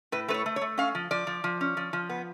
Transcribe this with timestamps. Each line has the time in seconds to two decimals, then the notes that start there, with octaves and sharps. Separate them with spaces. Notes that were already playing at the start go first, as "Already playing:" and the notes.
0.12 A2 B4
0.28 A3 B4
0.34 C#5
0.46 A3
0.56 C#5
0.61 A3
0.78 C#4 F5
0.95 F3
1.11 F3 D5
1.27 F3
1.44 F3
1.61 C#4
1.77 F3
1.93 F3
2.09 B3